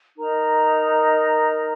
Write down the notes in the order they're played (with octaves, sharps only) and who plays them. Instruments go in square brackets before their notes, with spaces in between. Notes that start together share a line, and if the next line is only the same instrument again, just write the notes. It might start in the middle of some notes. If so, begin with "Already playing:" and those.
[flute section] D#4 A#4 D#5 A#5